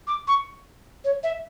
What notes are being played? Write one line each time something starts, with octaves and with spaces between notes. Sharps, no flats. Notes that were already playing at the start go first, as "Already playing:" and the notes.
D6
C#6
C#5
E5